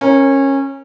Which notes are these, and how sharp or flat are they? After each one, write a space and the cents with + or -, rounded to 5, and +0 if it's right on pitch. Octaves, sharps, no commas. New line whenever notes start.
C#4 -20 A#4 +0